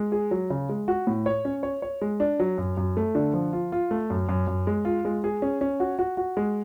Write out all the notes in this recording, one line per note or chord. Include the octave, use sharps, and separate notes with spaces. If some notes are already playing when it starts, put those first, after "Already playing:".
Already playing: G#3
G#4
F#3
C#3
G#3
F#4
A2
C#5
C#4
C#5
C#5
G#3
D4
F#3
F#2
F#2
A3
D3
F3
F4
F4
A3
F#2
F#2
F#2
G#3
F4
G#3
G#4
C#4
C#4
F#4
F#4
F#4
G#3